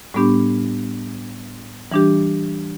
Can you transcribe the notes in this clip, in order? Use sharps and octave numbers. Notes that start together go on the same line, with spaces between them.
A2 G3 B3 D4 G4
E3 G3 D4 G4